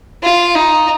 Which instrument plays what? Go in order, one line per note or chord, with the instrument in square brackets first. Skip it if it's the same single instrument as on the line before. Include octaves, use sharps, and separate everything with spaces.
[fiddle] F4
D#4